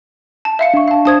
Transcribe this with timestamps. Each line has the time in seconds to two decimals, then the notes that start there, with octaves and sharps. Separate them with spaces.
0.45 A5
0.59 E5 F5 C#7
0.74 D4 C#6
0.88 F5 A5
1.05 D4 C5 A5 D#6 G#6